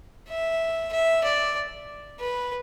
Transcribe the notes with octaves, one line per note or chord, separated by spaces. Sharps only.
E5
E5
D5
B4